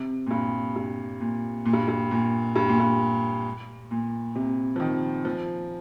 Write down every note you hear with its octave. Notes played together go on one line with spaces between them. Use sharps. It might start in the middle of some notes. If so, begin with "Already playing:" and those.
Already playing: C3
A#2
G2
G2
A#2
A#2
G2
G2
A#2
G2
A#2
G2
A#2
C3
F3
D#3
F3